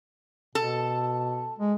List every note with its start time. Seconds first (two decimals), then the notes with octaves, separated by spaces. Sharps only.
0.55 B2 A4
1.59 G#3